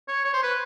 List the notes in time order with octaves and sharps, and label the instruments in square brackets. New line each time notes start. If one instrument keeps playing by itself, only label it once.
[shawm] C#5
C#5
C5
B4